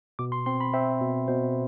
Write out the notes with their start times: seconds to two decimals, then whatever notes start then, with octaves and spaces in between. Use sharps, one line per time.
0.19 B2 D6
0.32 C6
0.46 C4 C6
0.61 B5
0.73 C4 E5
1.01 B2
1.28 B2 C5